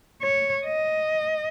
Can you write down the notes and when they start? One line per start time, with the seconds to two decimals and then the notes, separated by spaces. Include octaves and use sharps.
0.22 C#5
0.65 D#5